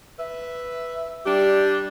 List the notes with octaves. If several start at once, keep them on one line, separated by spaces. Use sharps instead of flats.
B4 E5
G3 D4 G4